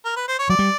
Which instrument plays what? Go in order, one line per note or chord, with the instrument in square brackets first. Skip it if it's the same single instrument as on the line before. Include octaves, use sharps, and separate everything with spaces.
[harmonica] A#4
B4
C5
C#5
[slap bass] F#3 [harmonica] D5
[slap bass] G3